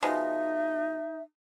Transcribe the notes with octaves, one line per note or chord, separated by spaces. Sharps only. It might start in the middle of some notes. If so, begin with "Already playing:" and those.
B2 F3 G#3 D#4 E5